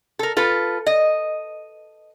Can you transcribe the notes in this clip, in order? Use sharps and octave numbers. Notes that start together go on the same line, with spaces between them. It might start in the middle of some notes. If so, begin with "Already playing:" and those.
A4 A#4
F4 A4 B4
D#5